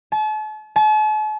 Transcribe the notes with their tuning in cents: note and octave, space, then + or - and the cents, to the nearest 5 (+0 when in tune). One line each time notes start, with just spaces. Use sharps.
A5 -40
A5 -45